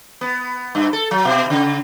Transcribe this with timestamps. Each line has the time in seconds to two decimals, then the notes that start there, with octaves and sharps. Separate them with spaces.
0.21 B3
0.75 G2
0.93 A4
1.11 F#3
1.25 B2
1.50 C#3